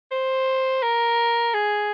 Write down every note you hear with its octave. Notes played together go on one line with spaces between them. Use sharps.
C5
A#4
G#4